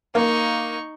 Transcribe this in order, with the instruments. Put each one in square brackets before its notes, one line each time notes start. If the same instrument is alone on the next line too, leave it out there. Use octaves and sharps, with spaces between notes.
[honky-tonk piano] A#3 [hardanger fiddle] D#4 C#6